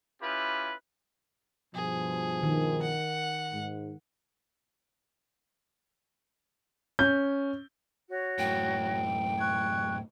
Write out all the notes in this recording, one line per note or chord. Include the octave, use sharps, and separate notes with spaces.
C#4 E4 F4 G4 B4
G2 B2 F3 G#4
D#3
F#5
G#2
C#4 G6
F#4 C#5
F#2 A2 G5
C#6 F#6 G#6